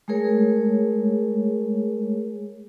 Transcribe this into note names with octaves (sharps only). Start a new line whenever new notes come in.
G#3 A3 G#4 A#4 C#5